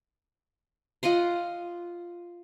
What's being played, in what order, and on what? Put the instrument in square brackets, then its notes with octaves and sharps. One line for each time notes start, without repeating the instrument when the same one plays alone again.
[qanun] F4 D#5 F#5 C6